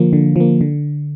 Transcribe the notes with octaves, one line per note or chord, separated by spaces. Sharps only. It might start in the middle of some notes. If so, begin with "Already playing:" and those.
Already playing: D3 F3 A#3
D3
F3 A#3
D3